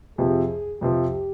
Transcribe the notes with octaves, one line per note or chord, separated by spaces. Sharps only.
F2 C3 F3 G#4
F2 C3 F3 G4